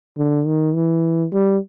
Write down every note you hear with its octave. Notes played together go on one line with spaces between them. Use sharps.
D3
D#3
E3
G3